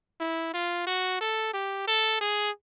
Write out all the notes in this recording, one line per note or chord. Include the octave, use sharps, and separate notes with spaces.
E4
F4
F#4
A4
G4
A4
G#4